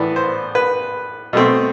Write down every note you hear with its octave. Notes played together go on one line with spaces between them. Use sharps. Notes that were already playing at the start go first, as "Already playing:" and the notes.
Already playing: A2 E3 B3 D5
C5
B4
B2 A3 C4